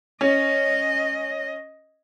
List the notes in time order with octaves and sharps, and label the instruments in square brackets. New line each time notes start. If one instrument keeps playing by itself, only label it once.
[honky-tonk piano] C#4 [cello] D#5